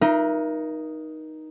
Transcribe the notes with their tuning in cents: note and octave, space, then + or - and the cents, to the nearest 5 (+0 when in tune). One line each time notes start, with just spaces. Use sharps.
D#4 +0 A#4 +35 E5 +35